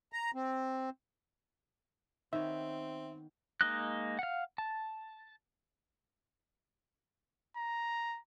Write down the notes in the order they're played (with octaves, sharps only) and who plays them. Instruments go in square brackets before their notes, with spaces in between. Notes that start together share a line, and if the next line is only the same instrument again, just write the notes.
[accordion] A#5
C4
[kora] D#3 B3 C#5 [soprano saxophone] C4 [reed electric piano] E5
[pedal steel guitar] G#3 A#3 D#4 D#5 F#6
F5 F#5
A5
[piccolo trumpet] A#5